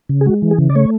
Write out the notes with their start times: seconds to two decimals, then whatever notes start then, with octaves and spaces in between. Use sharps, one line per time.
0.09 C#3
0.21 G#4
0.26 G#3 F#4
0.42 E3
0.51 G#4
0.58 C#3
0.70 D5
0.75 A3 C#5